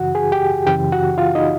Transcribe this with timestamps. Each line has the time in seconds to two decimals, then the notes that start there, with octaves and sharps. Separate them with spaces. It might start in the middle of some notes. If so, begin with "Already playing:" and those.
Already playing: F#2 C#3 E3 F#4 F#5
0.15 G#4 G#5
0.32 G4 G5
0.66 F#2 C#3 E3 G4 G5
0.92 F#4 F#5
1.18 F4 F5
1.35 D#4 D#5